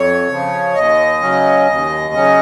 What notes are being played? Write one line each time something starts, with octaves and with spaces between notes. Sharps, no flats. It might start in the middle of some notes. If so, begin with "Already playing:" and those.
Already playing: F2 C#5
C#3 F3
D#2 D#5
C#3 F#3 C#4
D#2
C#3 F#3 C#4